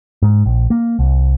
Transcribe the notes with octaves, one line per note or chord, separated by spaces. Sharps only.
G#2
A#1
A#3
C2